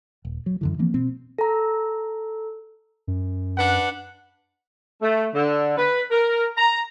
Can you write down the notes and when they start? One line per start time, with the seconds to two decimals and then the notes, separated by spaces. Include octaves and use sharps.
0.25 D#1
0.46 F#3
0.61 F#2 D3 E3
0.79 E3 F3 A#3 C4
0.94 B2 C4
1.38 A4 A#5
3.07 F#2
3.57 D4 B4 F#5
5.02 A3
5.34 D3
5.77 B4
6.11 A#4
6.57 A#5